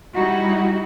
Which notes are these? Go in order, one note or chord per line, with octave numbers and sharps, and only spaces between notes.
G3 D#4 E4 F#4